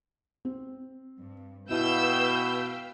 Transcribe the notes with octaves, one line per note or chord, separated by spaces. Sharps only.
C4
G2
B2 E4 B4 F5 G5 E6 G6